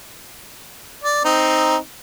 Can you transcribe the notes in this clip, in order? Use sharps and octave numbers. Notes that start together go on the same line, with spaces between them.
D5
C4 D#4